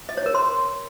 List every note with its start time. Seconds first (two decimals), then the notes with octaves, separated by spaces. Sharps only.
0.09 D#5
0.17 C#5
0.26 A#4
0.35 C6